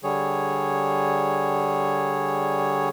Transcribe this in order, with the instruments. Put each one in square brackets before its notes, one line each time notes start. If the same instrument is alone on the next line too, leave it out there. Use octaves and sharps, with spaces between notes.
[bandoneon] D3 G3 G#4 C#5